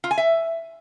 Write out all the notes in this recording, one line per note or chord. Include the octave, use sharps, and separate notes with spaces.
F4
G#5
E5